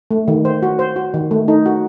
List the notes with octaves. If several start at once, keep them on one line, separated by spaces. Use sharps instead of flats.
A3
D#3
C5
F#4
C5
F#4
D#3
A3
D#4
F#4